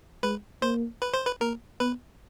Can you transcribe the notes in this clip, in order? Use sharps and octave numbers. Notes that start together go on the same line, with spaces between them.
G#3 B4
A#3 C5
B4
C5
B4
A#3 A#4
B3 B4